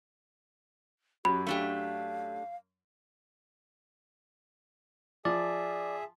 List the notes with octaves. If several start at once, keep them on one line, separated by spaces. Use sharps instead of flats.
F#2 F#3 G4 B5
A3 D4 G4 F5
F3 G#4 D5 E5